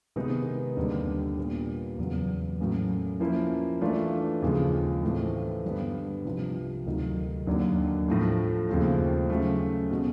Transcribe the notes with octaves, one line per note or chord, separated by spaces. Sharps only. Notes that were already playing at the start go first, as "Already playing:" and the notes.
C3 D#3 G#3 B3 D#4
D#2 D3 G3
A#2 G3 B3
E2 C#3 F#3 B3
A2 F#3 A#3 C#4
F3 A#3 C#4 E4
E3 A3 D4 F4
D#2 C#3 F3 G#3
A2 E3 A3 C4
G2 D3 G3 B3
C2 C3 F3
D2 C3 D#3 F#3
D#2 D3 F#3 A#3 D4
A2 F3 A3
D#2 C#3 F3 A3 C4
C#3 F#3 A3 C#4
B2 G#3 C#4 F#4